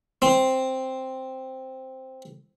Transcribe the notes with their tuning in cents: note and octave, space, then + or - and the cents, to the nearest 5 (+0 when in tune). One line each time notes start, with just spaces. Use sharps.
C4 +0